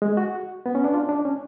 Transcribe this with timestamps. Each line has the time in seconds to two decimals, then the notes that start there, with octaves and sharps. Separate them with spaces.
0.02 G#3
0.17 F#4
0.66 B3
0.75 C#4
0.84 D4
0.94 F4
1.09 D4
1.25 C#4